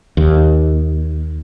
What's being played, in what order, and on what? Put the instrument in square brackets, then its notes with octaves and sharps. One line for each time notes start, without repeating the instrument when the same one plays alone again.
[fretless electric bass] D#2